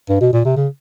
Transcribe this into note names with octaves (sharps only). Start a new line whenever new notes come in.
G2
B2
A#2
C3
C#3